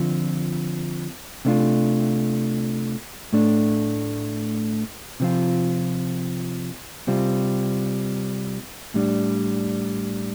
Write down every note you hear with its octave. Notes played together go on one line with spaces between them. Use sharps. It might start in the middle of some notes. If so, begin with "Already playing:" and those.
Already playing: D3 F3 C4 F4
C3 A3 D4 F4
A2 A3 D4
C3 F3 C4 F4
C3 G3 C4 F4
A2 G3 D4